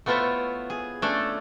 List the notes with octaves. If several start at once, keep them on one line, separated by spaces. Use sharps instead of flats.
A3 B3 E4 F4 C5 C#5
G#4
A3 C#4 D4 A4